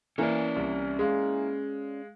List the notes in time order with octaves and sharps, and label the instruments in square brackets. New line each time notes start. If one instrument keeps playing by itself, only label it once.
[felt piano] E3 A#3 [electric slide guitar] C#4 D5
[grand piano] C2
G#3 F5